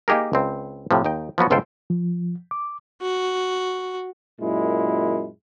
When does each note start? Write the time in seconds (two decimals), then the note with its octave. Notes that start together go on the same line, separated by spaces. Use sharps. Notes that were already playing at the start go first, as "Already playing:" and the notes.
0.08 A#3 D#4 G4 G#4 A#4
0.33 C#2 C4
0.91 A2 C3 F3
1.04 D#2 D#4 G5
1.38 F3 F#3 B3 F#4
1.50 G1 C#2 F4 A4 C5 G5
1.90 F3
2.51 D6
3.02 F#4
4.41 F#2 A#2 G#3 E4